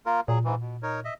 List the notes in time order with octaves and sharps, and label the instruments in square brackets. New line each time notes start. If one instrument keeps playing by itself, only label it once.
[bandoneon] A#3 F4 A#4
[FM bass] A#2 [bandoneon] F#3 G#4
[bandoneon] G#2 E3
B2
D#4 A#4 C#5
D#5 E5